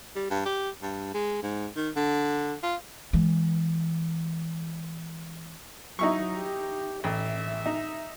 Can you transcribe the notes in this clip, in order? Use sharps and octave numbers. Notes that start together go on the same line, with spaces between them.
G3
G2
G4
G2
G#3
G#2
D#3
D3
F4
E3 G#3
F#3 D#4 E4 C#6
G4
A1 E5
D#4